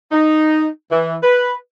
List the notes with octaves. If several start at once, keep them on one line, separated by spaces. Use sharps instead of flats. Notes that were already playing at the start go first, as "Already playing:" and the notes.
D#4
E3
B4